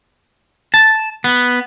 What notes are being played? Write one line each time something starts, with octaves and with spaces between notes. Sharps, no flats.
A5
B3